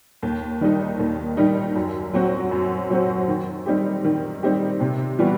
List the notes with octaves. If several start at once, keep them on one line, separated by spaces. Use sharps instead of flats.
D#2
D#3 G3 D#4
D#2
D#3 G3 D#4
F#2
F#3 C4 F#4 C5
F#2
F#3 C4 F#4 C5
D#3
G3 C4 D#4 G4
D#3
G3 C4 D#4 G4
C3
E3 G3 B3 F#4